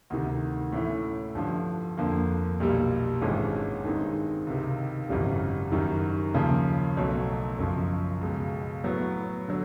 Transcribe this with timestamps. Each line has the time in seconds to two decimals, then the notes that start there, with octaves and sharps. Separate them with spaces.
0.10 D2 C3 D#3
0.72 A2 E3 A3 C#4 E4
1.35 G2 D3 F3
1.97 F2 D3 F3 A#3
2.60 B1 A#2 G3
3.22 G#1 G2 E3 G#3 C#4
3.85 G2 D#3 G#3 C4 D#4
4.47 C#2 C3 D#3
5.09 G#1 F#2 C#3 E3 G3
5.71 F#2 D#3 G3
6.34 D#2 C#3 F3
6.97 B1 B2 F#3 A3
7.59 F#2 C#3 F3
8.21 C#2 B2 G#3
8.84 A2 F#3 B3
9.48 D3 F#3